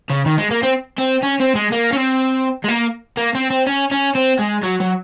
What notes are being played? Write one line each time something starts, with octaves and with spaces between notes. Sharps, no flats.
C#3
D#3
G#3
A#3
C4
C4
C#4
C4
G#3
A#3
C#4
C4
G#3
A#3
A#3
C4
C4
C#4
C#4
C4
G#3
F#3
F#3